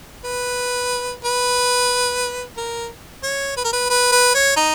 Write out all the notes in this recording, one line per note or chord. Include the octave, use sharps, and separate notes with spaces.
B4
B4
A#4
C#5
B4
A#4
B4
B4
B4
C#5
D#4